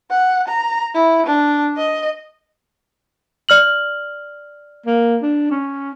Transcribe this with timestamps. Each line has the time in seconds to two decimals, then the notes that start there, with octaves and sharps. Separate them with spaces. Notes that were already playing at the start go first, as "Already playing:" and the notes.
0.11 F#5
0.48 A#5
0.94 E4
1.27 D4
1.77 D#5
3.49 D5 F6 F#7
4.86 A#3
5.22 D4
5.51 C#4